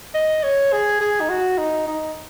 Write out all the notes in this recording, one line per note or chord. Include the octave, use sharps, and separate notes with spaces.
D#5
C#5
G#4
G#4
D#4
F#4
D#4
D#4